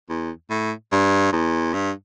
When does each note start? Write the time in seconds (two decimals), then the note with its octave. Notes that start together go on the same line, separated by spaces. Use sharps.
0.09 E2
0.50 A2
0.92 G2
1.32 E2
1.74 G2